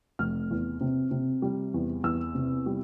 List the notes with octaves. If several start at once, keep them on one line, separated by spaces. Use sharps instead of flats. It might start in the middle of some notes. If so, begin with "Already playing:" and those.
F1 F6
E2
C3
C3
G3
E2
E2 E6
C3
G3